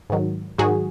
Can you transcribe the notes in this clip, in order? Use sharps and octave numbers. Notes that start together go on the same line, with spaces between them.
G#2 D#3 F#3
G#2 D#3 F#3 F#4 G#4